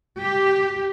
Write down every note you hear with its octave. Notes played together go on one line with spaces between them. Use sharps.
G4